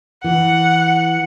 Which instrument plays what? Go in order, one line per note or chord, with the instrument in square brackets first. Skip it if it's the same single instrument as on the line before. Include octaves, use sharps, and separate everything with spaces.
[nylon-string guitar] E3 [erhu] F#5